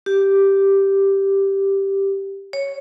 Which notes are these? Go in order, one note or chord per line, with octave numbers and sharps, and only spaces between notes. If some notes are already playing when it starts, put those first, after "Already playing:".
G4
C#5